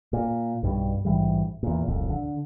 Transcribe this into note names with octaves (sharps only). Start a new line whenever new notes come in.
A#2
B1 G2 B2 G3
A#1 G#2 E3 G3
E2 A#2
D1 C2 F2
D3